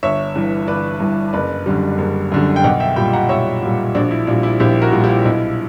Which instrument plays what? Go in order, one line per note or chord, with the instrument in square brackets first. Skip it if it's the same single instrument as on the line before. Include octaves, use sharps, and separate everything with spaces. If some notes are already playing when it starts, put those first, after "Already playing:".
[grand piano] G1 C#5 E5
G2 E3
G1 B4 D5
G2 E3
F#1 B4 D5
F#2 D3 G3
F#1
F#2 D3 G3
G5
B1 D5 F#5
E5 G5
A#2 G3 G5 B5
F#5 A#5
B1 C#5 E5
A#2 G3
A#1 D4 F#4
E4
A#2 D4
G3
E4
A#1 E4 G4
F#4 A#4
A#2 G3
E4 G4
B1 E4